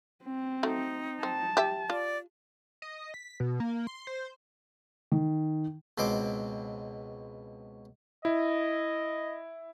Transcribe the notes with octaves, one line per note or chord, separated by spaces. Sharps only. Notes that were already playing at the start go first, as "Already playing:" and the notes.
C4
F#3 A3 D#4
C4 A5
G4 E5
F4 D5
D#5
B6
B2
A#3
C6
C5
D#3
C#2 B2 C4 C6 D6
E4 D#5